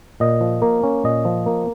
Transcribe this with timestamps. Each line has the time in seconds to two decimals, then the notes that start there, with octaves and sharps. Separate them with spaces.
0.20 A#2 D#5
0.41 F3
0.62 A#3
0.83 C#4
1.04 A#2 D#5
1.25 F3
1.46 A#3